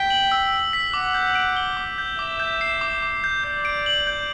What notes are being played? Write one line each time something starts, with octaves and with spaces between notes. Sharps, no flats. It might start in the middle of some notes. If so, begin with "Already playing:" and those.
Already playing: G5 B6
F#7
E6
E6
B6
F#5 D6
G6
D7
G7
D6
G6
E5 D6
G6
C7
D6
D6
G6
D5 G6
D7
F#7
G6